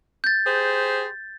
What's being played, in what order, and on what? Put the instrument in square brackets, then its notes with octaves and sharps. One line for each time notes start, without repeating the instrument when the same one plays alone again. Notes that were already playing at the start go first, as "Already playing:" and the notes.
[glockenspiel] G6 A6
[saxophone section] G4 G#4 C5